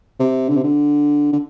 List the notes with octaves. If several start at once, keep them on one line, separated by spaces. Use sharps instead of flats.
C3
D3
C3
D3
D3